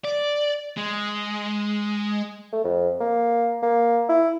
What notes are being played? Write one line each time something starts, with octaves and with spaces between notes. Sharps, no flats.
D5
G#3
A3
F2
A#3
A#3
E4